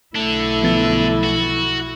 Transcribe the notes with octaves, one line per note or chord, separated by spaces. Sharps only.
B1 D3 A3 D4 E4
F3 B3 A6
F#4